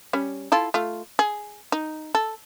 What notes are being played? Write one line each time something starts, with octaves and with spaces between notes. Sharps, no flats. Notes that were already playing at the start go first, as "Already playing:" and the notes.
G3 C#4
E4 F4 A4
A3 F4
G#4
D#4
A4